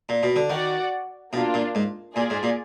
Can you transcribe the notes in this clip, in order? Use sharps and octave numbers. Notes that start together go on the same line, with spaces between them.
A#2
B2
D3
D#3 F#4 D5 F#5
B2 A#3 D4 F4
A#2
G#2
A#2 F4 G#4 D5 G#5
G#2
A#2